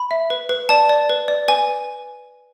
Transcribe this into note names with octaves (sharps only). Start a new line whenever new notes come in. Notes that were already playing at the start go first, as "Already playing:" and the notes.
Already playing: B5
E5
B4
B4
D5 A5
D5
B4
D5
B4 G#5